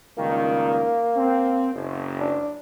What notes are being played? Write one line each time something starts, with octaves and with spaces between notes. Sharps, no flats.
C#2 G2 D#3 A#3
C4
F#1
D4